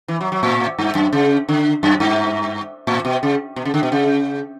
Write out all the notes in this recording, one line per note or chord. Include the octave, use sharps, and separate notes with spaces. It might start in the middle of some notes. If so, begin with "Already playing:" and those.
E3
F#3
F#3
A2
G2
F#2
C#3
D3
F#2
G2
A2
B2
C#3
B2
C#3
D3
B2
C#3